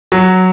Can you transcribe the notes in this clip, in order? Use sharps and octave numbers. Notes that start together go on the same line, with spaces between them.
F#3